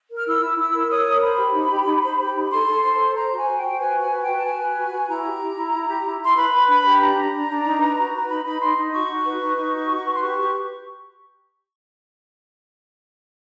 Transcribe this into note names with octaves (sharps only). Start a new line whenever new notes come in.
A#4
F6
E4 E6
E4
E4 E6
A#4
C#5 D#6
A#4
C5 B5
G4
D#4
G4
D#4
C5
G4
D#4
A4 C6
A4
C5 C6
C5
C5 A#5
F#4 G#5
C5
F#4 G5
B4 G#5
F#4
G#5
B4
G5
F#4
A5
B4 G#5
B4
F#4
F#4
E4 A#5
G4
E4
E4
E4
G4
E4
E4 C6
B4 B5
B4
D4 B5
G4
D4 A#5
D4
D4
D4
D#4
B4
F#4
B4
D#4 B5
D#4 B5
D#4 C6
D#4
F#4 C#6
D#4
B4
D#4
D#4
F#4
F#4
B4
C6
G4 C#6
G4